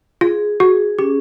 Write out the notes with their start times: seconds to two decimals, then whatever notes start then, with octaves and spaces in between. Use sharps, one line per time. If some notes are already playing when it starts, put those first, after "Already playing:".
0.21 F4 G#4
0.60 F#4 G#4
0.99 C#4 G4